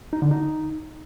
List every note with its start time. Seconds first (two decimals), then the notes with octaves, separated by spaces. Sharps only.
0.13 D#4
0.22 D3
0.31 D#4